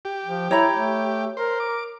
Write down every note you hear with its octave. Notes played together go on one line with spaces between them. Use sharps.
G4
F3
E4 C#5 A#5 B5
A3
A#4 C5
D6